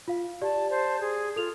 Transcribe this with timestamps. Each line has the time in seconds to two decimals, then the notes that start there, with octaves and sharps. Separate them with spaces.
0.08 F4 F5
0.42 G4 D5 A5
0.70 C5 A5
1.00 G#4
1.36 F4 A4 F7